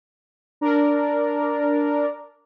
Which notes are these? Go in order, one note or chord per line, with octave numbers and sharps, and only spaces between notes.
D4 A#4 D5